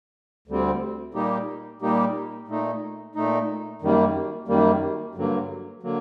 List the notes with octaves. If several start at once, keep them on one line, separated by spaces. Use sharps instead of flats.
D2 D3 G3 C4
A#2 G3 A#3 D#4 G4
A#2 G3 A#3 D#4 G4
A#2 A3 D#4
A#2 A3 D#4
F#2 D#3 G3 A#3
F#2 D#3 G3 A#3
G2 D3 F#3 A#3
D3 F#3 A#3